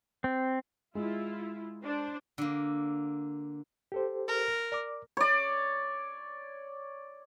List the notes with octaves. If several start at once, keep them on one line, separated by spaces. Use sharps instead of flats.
C4
G#3 E4 F4
D4 C5
D3 A#3
G4 A4 C5
A#4
D5 D6
C#5 D5